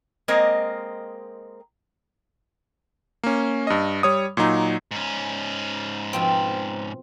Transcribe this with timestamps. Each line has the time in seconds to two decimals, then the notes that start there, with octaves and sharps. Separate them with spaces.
0.28 G#3 A#3 C4 A#4 D#5
3.23 A#3 C#4
3.67 G2 D#5
4.03 G3 C#5 D#6
4.37 A#2 F#3 D#4
4.91 G#2 C#4
6.13 B2 F3 C4